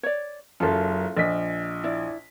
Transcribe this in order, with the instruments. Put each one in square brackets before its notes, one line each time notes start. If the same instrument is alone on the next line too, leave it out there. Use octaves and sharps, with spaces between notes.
[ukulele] C#5 D5
[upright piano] F#1 F#2 [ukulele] F4 A4
[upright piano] A#1 D#5 B6
[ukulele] E4 D5